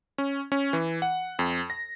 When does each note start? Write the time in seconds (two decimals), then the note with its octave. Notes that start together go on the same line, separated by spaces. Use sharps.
0.18 C#4
0.52 C#4
0.73 E3
1.02 F#5
1.39 F2
1.70 A#6